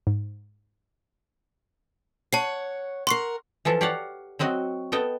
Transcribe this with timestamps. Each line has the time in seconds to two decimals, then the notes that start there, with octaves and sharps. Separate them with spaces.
0.07 G#2
2.33 C#5 F#5 A5 C7
3.07 A#4 F#5 C6 C#6 C7
3.65 E3 F3 F4 A4
3.81 G4 C#5 D5 F5 F#5
4.39 F#3 C4 F#4 D#5
4.92 B3 A4 D#5 G5